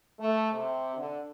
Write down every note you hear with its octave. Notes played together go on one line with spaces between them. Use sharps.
A3
C3
D3